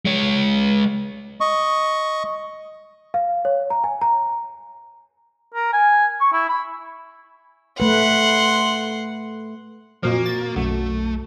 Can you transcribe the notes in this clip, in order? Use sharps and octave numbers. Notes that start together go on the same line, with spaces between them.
G#3 C#5
D#5 C#6
F5
C#5
A#5
G#5
A#5
A#4
G#5
C#6
E4
B5
A3 B4 F#5 C6
F2 A#2 F3 A#3 F#4
A6
B1 F#2 A3